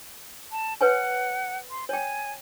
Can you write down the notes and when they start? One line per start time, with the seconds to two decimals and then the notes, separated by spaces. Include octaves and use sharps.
0.52 A5
0.81 B4 C#5 F#5 G#5
1.70 C6
1.89 C#5 G5 G#5